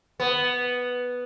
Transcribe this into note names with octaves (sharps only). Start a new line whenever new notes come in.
B3